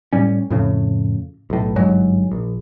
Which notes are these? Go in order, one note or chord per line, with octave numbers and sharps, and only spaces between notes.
A2 G3 C#4
F2 A2 C#3
B1 A2
G1 G#2 F#3 G#3
A#1